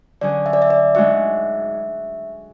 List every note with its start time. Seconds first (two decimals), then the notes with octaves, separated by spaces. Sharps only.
0.21 D3 F#3 C#4 G#4 D5
0.46 E5
0.53 D5
0.62 E5
0.70 D5
0.95 G#2 G#3 D4 F#4 E5